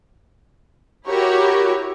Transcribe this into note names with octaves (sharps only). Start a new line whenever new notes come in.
E4 F#4 G4 A#4 C#5